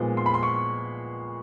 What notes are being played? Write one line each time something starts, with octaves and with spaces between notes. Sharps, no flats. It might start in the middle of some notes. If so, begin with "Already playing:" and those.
Already playing: A#2 F3 G#3 B3 D#4
C6
B5
C6
C#6